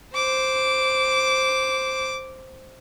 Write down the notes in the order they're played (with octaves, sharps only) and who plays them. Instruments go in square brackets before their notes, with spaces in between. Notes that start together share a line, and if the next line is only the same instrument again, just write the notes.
[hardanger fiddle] C5 [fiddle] D6